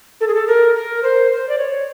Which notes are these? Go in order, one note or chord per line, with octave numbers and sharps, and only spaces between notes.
A4
G#4
A4
A#4
A#4
C5
C5
D5
C#5